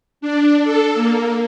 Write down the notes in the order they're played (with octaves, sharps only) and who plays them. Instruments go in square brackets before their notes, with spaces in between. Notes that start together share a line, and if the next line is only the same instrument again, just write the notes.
[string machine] D4
A4
A#3